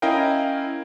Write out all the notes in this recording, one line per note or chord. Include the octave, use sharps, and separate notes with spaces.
C#4 E4 A#4 D#5 F5 G5